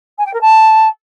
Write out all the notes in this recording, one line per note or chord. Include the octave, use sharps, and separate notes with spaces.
G#5
G5
A#4
A5